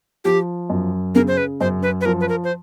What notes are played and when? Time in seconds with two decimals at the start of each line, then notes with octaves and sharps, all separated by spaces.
0.25 F3 G4
0.69 F#2
1.15 C#3 A#4
1.28 C5
1.37 B4
1.60 F#2 C5
1.83 B4
2.01 B4
2.05 F3 A#4
2.21 B4
2.29 A#4
2.44 C5